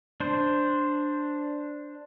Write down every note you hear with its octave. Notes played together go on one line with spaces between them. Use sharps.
D4 C5